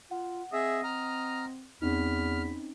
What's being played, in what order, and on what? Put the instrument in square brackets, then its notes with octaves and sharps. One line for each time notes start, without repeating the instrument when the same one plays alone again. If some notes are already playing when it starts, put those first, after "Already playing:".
[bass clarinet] F4 [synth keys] F#5
[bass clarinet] C4 [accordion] G#4 E5 [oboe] D#5
[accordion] A#5 F6
[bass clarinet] E2 [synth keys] C4 C#4 D#4 [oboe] B5 [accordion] F6